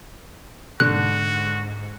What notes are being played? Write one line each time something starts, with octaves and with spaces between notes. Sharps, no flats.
G#2 D3 F#4 F#6